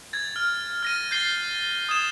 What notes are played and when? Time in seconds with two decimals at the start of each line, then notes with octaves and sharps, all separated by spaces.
0.13 G#6 A6
0.36 F6
0.83 F6 A#6 D#7
1.11 G6 A6 C7 G7
1.89 D#6 G#6 E7 G7